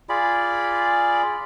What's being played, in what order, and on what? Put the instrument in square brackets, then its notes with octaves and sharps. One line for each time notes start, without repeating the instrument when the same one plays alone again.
[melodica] F4 G#4 D5 B5